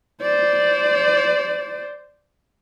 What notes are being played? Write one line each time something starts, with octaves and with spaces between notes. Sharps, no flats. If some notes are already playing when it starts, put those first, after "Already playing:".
C5 D5